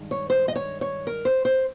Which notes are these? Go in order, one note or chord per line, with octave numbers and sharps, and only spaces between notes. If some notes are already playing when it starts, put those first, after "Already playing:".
Already playing: G2 D#3 G#3
C#5
C5
D#5
C#5
C#5
A#4
C5
C5